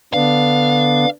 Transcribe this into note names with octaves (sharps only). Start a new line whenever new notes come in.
D3 B3 D4 F5